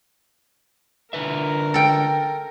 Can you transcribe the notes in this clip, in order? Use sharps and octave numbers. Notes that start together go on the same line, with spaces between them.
D3 A#4 B4 E5
A4 G5